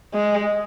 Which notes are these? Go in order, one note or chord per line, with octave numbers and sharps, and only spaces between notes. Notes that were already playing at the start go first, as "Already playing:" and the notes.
G#3